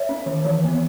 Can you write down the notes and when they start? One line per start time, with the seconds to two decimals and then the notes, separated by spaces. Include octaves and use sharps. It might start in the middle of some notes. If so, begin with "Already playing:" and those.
Already playing: C#5 E5
0.09 C#4
0.26 D#3
0.45 E3
0.64 B3